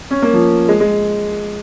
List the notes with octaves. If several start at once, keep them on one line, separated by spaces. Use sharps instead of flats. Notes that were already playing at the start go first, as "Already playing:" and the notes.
C#4
A#3
F3
G#3
G#3